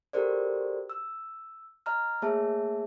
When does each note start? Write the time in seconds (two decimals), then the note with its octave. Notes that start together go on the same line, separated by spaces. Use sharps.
0.13 F#4 G4 A4 A#4 C5 D5
0.90 E6
1.86 D#5 A#5 F6
2.22 A3 A#3 G#4 C#5 E5 A5